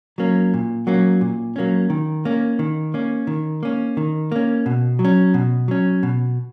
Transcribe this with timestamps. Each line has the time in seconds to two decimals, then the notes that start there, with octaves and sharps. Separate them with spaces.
0.18 F#3 A#3 C#4
0.54 A#2
0.87 F#3 A#3 C#4
1.21 A#2
1.56 F#3 A#3 C#4
1.90 D#3
2.25 A#3 C#4
2.59 D#3
2.94 A#3 C#4
3.27 D#3
3.63 A#3 C#4
3.97 D#3
4.32 A#3 C#4
4.66 B2
4.99 F#3
5.05 C#4
5.34 B2
5.68 F#3 C#4
6.03 B2